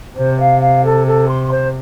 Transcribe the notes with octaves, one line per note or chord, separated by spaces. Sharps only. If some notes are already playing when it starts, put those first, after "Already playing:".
C3 C5
F5
F5
A4
A4
C6
C5